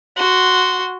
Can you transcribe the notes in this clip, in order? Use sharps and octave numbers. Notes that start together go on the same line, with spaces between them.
F#4 C6